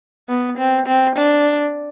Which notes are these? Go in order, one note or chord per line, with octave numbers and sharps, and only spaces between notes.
B3
C4
C4
D4